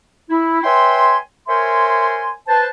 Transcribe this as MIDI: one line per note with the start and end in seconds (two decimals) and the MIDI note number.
0.30 0.60 64
0.64 1.17 71
0.64 1.17 73
0.64 1.17 76
0.64 1.17 79
0.64 1.17 80
0.64 1.17 84
1.47 2.32 70
1.47 2.32 72
1.47 2.32 73
1.47 2.32 76
1.47 2.32 80
1.47 2.32 84
2.48 2.67 71
2.48 2.67 72
2.48 2.67 81